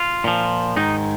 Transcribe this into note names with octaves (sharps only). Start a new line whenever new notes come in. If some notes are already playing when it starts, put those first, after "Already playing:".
Already playing: F4
A#2 F3
G#2 D#3 D#4